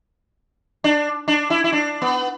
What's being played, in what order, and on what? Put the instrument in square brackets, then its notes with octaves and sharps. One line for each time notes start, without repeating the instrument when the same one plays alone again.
[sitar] D4
D4
E4
E4
D4
B3